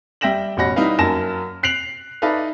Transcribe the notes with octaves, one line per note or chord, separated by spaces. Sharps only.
G3 E5 G5 A#6 E7 F#7
A1 B2 C#4 F#5 B5 A#6
G3 D#4 E4 B4 F5
F#2 A#3 G#5 A5 A#6 E7
F#6 C7 D7 F7 F#7
D#4 A4 B4 D5 E5 F5